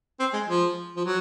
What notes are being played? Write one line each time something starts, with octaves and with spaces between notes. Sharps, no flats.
C4
G#3
F3
F3
F#3